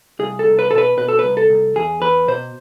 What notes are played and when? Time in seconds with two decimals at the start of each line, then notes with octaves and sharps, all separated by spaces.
0.19 C2 G#4
0.39 A4
0.45 C2
0.59 B4
0.71 B2 A4
0.78 B4
0.97 B2 B4
1.09 A4
1.19 B4
1.24 C2
1.37 A4
1.50 C2
1.76 E2 G#4
2.02 E2 B4
2.28 B2 C5